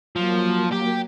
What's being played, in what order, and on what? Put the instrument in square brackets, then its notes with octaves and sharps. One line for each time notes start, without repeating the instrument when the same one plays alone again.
[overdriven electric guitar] F3 [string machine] F#3 A#3
[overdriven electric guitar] G4